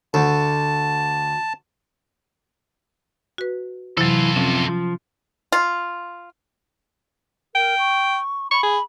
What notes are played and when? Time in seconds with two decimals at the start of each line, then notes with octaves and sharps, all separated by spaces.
0.14 D2 A5
3.38 F#4 B4
3.97 C3 E3 F#3 F4 A4
4.36 C3 F3 C#4
4.68 F3
5.52 F4
7.55 A#4 G5
7.79 C#6
8.51 B5 C#6
8.63 G#4